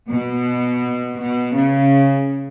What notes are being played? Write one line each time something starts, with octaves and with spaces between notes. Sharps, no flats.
B2
B2
C#3